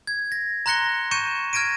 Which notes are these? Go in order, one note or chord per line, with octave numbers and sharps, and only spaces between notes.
G#6
A#6
A#5 C6 F#6 A#6 C#7 G7
C#6 G6 A#6 C#7 D#7 E7
F6 G#6 A#6 D7 D#7